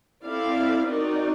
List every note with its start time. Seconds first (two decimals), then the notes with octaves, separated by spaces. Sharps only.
0.25 C4 E4 A4 D5 F5
0.87 C4 D#4 F#4 A#4 D5